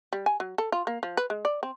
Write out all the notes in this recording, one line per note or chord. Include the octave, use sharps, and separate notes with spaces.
G3
G#5
F#3
A4
F4
A#3
F3
B4
G#3
D5
C4